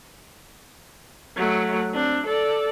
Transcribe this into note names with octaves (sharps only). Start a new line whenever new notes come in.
F#3 A3
C4 D4
A4 D5